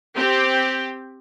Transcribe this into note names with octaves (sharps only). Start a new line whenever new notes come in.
C4 G4